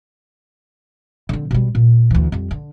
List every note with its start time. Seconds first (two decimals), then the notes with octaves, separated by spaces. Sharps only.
1.29 D3 C4
1.51 B2 G3
1.75 A#2
2.11 D2 E3
2.32 F2 G3
2.51 D3